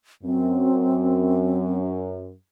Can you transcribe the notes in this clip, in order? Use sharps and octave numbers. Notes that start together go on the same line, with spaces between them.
F#2 C4